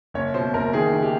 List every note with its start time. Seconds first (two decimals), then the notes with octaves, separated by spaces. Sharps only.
0.14 F#1 C#5
0.34 B2 C5
0.54 F#1 A#4
0.73 D#3 G#4
0.93 D#3
1.03 G4